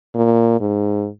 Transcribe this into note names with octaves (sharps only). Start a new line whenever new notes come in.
A#2
G#2